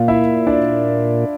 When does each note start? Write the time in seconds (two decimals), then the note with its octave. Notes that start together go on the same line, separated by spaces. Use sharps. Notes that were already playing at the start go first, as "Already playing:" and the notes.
Already playing: A#2 F4 F5
0.08 E4 E5
0.47 D4 D5